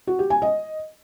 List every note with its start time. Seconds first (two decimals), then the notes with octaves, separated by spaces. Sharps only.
0.07 F#4
0.19 G4
0.30 G#5
0.42 D#5